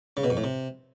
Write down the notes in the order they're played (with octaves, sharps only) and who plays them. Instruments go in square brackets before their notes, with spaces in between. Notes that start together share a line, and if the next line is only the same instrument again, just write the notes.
[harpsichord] C#3
B2
F2
A2
C3